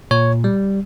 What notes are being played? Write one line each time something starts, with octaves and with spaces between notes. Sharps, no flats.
A#2 C#5
G3